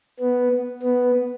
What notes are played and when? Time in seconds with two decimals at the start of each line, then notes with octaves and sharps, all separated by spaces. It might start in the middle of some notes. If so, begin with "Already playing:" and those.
0.20 B3
0.83 B3